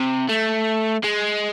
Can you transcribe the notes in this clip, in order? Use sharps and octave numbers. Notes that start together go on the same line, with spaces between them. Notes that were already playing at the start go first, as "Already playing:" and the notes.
Already playing: C3
A3
G#3